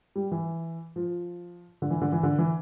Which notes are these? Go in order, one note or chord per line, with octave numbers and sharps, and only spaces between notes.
G3
E3
F3
D3
E3
D3
E3
D3
E3